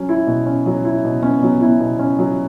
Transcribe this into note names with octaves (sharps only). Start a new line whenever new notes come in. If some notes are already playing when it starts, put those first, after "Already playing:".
Already playing: F#3 C#4
E4
B2
C#4
F#3
E4
B2
B3 C#4
F#3
E4
B2
C#4
F#3